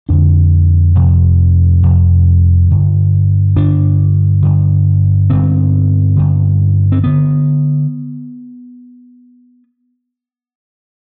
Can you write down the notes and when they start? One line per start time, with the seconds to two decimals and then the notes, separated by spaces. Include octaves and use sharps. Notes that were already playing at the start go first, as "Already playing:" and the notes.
0.09 F2 D3 D4
0.95 F2 C3
1.83 F2 C3
2.70 G2 D3
3.56 G2 D3 D4
4.42 G2 D3
5.30 G2 D3 C4
6.16 G2 D3
6.92 C4
7.04 D3 B3